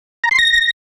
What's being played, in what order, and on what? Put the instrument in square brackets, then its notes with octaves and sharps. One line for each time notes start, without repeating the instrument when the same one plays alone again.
[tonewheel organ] A#5
C6
A#6